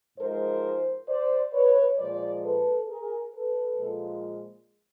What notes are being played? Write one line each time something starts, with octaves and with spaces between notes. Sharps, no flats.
G#2 F3 G#3 A#4 C5
C5 D5
B4 C#5
A#2 F3 G#3 C5 D5
A4 B4
G#4 A#4
A4 B4
A#2 F3 G#3